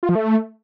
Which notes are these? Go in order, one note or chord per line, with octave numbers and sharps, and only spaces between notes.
F4
F3
A3